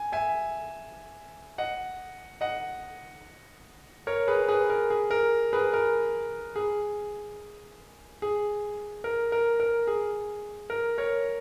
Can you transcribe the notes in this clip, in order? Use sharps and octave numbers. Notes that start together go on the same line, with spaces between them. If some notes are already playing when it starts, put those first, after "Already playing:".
Already playing: G#5
E5 G#5
D#5 F#5
D#5 F#5
A#4 C#5
G#4 B4
G#4 B4
A#4
G#4
A#4
G#4 B4
A#4
G#4
G#4
A#4
A#4
A#4
G#4
A#4
A#4 C#5